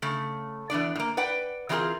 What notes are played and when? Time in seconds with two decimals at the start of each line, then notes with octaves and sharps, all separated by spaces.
0.02 C#3 A3
0.70 E3 B3 D4 D5
0.95 A2 A#3
1.17 B4 D5 F#5 G5
1.69 E3 F#3 C4 F4 G#4 A#4